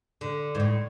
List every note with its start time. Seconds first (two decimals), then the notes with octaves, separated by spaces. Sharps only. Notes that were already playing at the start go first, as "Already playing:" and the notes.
0.21 D3
0.55 G#2
0.60 A2